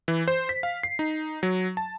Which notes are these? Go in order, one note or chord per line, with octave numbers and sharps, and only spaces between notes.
E3
C5
B6
F5
C7
D#4
F#3
A5